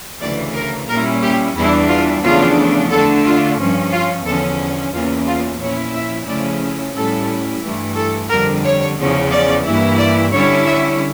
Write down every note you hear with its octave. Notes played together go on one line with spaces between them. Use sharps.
D2 C#3 E3 D5
A#4
A#2 G3 C#4 E4 A#4
G4
E2 E3 G3 D4 E4
F4
E2 C#3 F3 A3 D4 F4
D3 A3 D4 A4
F4
G2 F3 C#4
F4
E2 D3 F3 C#4 A4
E2 C#3 E3 A#3 C#4 F4
F4
A#2 F3 C#4 E4 C#5
E5
C#3 F3 A3 C#4 E4 D5
A2 G3 C#4 E4 A4
G2 E3 A3
A4
F2 D3 G3 A#4
C#5
E2 C#3 F3 C#4
D5
G2 E3 A#3 E4
D5
D3 G3 C#4 E4 C#5
E5